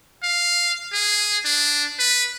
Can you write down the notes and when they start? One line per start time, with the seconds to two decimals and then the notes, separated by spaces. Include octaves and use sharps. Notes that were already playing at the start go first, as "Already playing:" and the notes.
0.23 F5
0.93 G#4
1.45 D4
1.99 B4